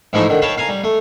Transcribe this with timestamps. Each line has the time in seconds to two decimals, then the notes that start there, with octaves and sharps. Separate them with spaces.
0.13 G#2 E3 F3 A3 D#4 E4
0.29 D3 D#3
0.42 C#5 F5 G5 A5 B5
0.58 F5 G#5 A#5
0.69 G3
0.84 A3